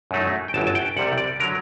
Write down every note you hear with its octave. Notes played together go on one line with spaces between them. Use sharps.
F#2 F#3 A3 D#4
G5
G1 F#2 F#3 A5
A5
G5
C2 C3 G3 F#5
D5
D3 F#3 A#4